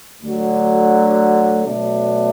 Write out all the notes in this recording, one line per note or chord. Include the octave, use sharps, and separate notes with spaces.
D2 D3 F#3
B2 F#3 A3 D4